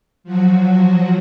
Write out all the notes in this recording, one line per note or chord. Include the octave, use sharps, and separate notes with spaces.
F3 F#3 F#4